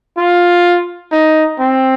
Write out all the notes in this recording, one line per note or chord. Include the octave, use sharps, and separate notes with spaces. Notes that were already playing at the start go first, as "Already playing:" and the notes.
F4
D#4
C4